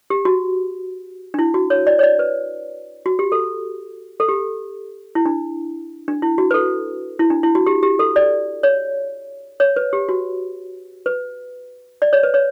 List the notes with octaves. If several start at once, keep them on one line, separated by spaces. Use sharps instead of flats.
G4
F#4
D4
E4
F#4
C#5
D5
C#5
D5
B4
F#4
G4
A4
A4
G4
E4
D4
D4
E4
F#4
B4
A4
E4
D4
E4
F#4
G4
G4
A4
D5
C#5
C#5
B4
G4
F#4
B4
D5
C#5
B4
C#5